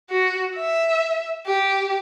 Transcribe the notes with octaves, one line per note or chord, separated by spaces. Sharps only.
F#4
E5
G4